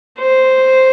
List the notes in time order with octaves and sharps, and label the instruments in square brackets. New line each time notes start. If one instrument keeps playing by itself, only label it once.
[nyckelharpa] C5